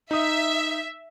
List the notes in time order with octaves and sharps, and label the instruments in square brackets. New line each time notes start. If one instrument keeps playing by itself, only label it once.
[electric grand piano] D#4 D#6 [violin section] E5